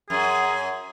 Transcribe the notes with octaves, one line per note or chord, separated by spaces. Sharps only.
F#2 G#4